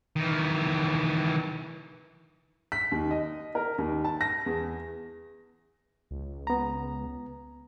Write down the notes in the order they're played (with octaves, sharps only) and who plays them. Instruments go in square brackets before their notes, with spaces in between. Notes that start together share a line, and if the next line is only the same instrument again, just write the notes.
[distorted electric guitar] D#3 E3
[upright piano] B6
D#2
D#5
A#4
D#2
A5
A#6
E2
[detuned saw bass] C#2
[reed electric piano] B3 A#5